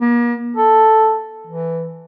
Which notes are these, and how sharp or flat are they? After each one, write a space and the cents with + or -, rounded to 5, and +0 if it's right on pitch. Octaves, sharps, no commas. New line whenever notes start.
A#3 +40
A4 +0
E3 +5